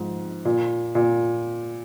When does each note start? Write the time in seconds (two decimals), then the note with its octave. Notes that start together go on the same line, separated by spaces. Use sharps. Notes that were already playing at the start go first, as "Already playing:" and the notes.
Already playing: G#2 F3
0.45 A#2
0.95 A#2